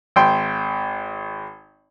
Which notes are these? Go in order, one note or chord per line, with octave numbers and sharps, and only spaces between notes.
G#1 G5 C6